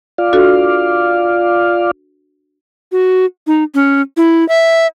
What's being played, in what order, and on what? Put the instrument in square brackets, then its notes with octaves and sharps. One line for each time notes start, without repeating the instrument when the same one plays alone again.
[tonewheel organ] F4 D5 F5
[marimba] D4 F#4 A4
[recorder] F#4
D#4
C#4
E4
E5